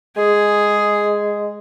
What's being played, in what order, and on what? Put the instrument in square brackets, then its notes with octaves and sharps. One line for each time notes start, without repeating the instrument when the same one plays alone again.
[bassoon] G#3 [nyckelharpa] G#4